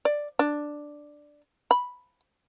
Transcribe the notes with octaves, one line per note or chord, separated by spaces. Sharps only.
D5
D4
B5